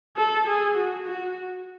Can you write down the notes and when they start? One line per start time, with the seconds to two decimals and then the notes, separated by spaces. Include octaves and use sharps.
0.16 A4
0.47 G#4
0.75 F#4
1.06 F#4